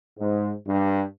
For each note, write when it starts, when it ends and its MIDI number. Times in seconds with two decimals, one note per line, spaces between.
0.19 0.50 44
0.66 1.01 43